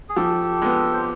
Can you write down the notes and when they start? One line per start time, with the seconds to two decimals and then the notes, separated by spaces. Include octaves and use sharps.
0.09 G#4
0.16 F3 G4 A4
0.62 G#3 B3
0.93 C5